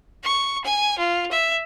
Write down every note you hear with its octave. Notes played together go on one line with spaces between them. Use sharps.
C#6
G#5
F4
E5